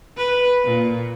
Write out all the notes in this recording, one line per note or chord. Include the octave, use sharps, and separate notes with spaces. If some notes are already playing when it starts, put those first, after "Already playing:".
B4
A#2